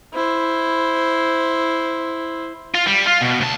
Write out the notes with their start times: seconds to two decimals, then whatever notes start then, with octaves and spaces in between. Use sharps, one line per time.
0.13 E4 C5
2.75 F4
2.88 G3
3.08 F4
3.22 B2
3.41 D2 A5